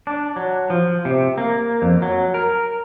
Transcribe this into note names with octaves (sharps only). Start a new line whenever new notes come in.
D4
F#3
F3
C3
A#3
F2
F#3
A#4